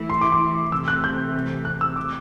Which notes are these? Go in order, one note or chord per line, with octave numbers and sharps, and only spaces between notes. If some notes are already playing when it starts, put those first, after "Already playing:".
Already playing: E3 A3 E4
C6
D6
C6
C3 E3 A3 E6
F#6
G6
F#6
E6
D6